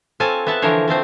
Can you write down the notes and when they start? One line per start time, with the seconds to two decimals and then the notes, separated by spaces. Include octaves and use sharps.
0.20 C4 F4 A4 C#5 G#5 A5
0.47 B3 E5 F#5 A5
0.62 D3 E3 F3 A#4 C5 C#5
0.88 F3 A3 C4 C5